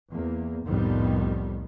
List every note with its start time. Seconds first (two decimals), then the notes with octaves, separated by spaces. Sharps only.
0.13 E2 A#3
0.66 C2 F2 A2 D#3 G3 B3